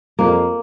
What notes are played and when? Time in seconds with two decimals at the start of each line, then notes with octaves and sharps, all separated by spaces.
0.19 F2 A#3